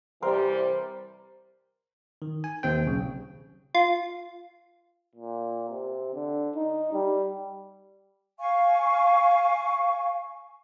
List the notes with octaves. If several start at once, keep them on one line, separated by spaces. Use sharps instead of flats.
C3 E3 G3 A#4 C5
D#3
G#5
D#2 C4 G5
B1 C#3
F4
A#2
C3
D3
D#4
G3
F5 G#5 C#6